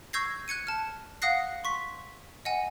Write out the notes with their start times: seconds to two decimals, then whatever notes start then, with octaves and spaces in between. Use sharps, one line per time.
0.13 C#6 E6 G6 G#6 A#6 C7
0.48 F#6 G#6 C#7 D#7
0.67 A5 F6
1.22 F5 F#5 D#6 F#6 A#6 C7
1.64 C6 C#6 B6
2.45 D#5 F#5 G#5